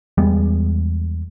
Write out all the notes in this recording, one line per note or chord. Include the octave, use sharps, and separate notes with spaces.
E2 G3 G#3 B3